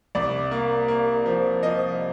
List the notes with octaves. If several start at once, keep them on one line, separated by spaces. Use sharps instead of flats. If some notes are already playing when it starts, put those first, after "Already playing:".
C2 D5
A#3
A#3
F3
F3 D#5